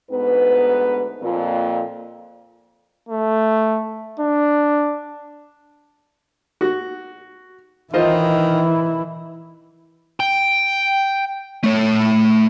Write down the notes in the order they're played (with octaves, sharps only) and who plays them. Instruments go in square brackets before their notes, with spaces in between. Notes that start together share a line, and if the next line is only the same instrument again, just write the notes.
[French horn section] D2 G#2 B3 B4
F2 A#2
[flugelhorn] A3
D4
[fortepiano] F#4
[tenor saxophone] D#3 [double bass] E3 E4 [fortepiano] F4 C5 D#5
[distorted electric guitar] G5
A3 C#5